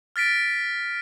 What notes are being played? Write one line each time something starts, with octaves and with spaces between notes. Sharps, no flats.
F6 A6 B6 D7